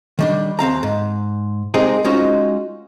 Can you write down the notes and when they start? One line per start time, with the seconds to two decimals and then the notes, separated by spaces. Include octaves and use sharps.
0.19 D#3 G3 D4
0.59 D#2 C4 F5 A#5
0.83 G#2
1.74 G#3 C4 D#4 G4 G#4 A#4
2.04 G#3 C#4 D#4 F4 F#4 C5